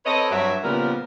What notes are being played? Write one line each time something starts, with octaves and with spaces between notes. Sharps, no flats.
C4 A4 B4 C#5 D#5
G2 F#3 E5
A#2 C#3 F3 G3 B3 A#4